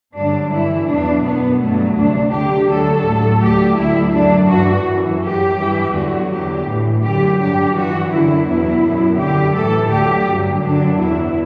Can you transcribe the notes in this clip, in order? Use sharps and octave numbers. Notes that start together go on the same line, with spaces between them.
G2 D3 F#3 D4
G2 E3 E4
E2 B2 F#3 D4
F#2 F#3 B3
G2 F#3 A3
D2 C3 F#3 D4
D2 D3 F#3 G4
D2 D3 F#3 A4
A2 F#3
D2 D3 F#3 G4
D2 D3 F#3 E4
F#2 D3 F#3 D4
G2 E3 F#4
F#2 E3
F#2 F#3 G4
G2 E3
E2 D3 F#3 F#4
E2 D3 F#3 G4
A2 E3
F#2 D3 F#3 G4
G2 D3 F#3 G4
G2 E3 F#4
F#2 D3 F#3 E4
E2 B2 F#3 E4
F#2 F#3
F#2 D3 F#3 G4
A2 E3 A4
D2 D3 F#3 G4
G2 D3 F#3
F#2 D3 F#3 D4
E2 B2 F#3 E4